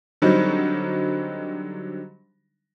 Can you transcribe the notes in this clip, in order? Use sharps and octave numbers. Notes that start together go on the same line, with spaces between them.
D3 F#3 G3 C4 D#4